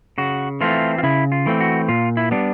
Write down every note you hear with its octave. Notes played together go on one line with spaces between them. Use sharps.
C#3 F#4
E3 A3 C4 F4
F4
C#3 E4
F4
E3 A3 C4
F#4
A#2 F4
E4
G3 B3 D4